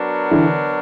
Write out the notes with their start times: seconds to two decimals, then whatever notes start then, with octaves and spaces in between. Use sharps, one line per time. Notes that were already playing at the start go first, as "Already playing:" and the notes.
Already playing: F#3 B3 D4 F#4 A#4
0.31 D3 E3